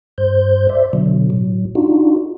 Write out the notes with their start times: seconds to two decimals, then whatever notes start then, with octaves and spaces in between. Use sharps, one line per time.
0.18 G2 C5 G6
0.69 C5 D5 E5
0.93 B2 D3 F#3
1.30 A2 F#3
1.75 D4 D#4 F4 F#4